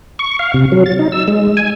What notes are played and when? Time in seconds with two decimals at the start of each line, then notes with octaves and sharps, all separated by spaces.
0.19 C#6
0.39 F5
0.54 C3
0.72 F#3
0.86 A6
0.99 D#4
1.12 E6
1.28 G#3
1.57 G#5